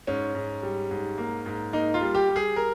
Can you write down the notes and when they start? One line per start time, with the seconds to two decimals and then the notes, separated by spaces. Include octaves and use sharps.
0.07 G#2 C#4
0.35 G#2
0.63 G3
0.91 G#2
1.18 A#3
1.46 G#2
1.73 A#3 D#4
1.94 F4
2.01 G3
2.15 G4
2.29 G3
2.36 G#4
2.56 A#4